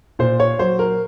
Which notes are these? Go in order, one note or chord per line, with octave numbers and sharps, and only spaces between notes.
A#2 C5
C#5
F#3 C5
A#4